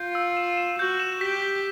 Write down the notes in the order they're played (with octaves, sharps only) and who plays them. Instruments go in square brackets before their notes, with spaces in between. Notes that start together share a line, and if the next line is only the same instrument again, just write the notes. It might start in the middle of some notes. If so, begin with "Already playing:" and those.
Already playing: [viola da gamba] F4 [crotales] G6
[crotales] E6
E7
E7
[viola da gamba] F#4 [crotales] G6
[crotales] E7
[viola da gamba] G4 [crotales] B6
[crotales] B6